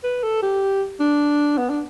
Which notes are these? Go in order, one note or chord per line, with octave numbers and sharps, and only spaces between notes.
B4
A4
G4
D4
B3
D4